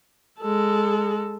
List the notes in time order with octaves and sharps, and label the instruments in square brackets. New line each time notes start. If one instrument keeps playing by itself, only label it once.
[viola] G#3 A4